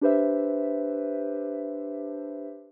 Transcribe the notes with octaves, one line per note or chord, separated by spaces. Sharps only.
D4 G4 B4 C5 E5